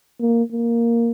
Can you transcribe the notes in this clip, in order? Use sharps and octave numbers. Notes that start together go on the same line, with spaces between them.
A#3
A#3